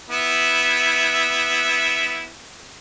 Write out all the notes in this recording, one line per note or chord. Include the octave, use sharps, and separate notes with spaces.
B3 E4 E5